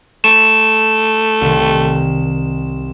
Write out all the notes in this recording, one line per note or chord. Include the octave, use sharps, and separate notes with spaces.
A3 E7
C2 D#3